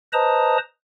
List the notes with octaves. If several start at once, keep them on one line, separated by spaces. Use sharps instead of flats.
B4 C5 D#5 A5 A#5 D#6